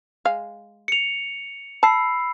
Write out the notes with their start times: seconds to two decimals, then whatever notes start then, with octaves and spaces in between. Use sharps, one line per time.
0.25 G#3 F5
0.88 C#7 F7
1.83 A5 B5 E6 C7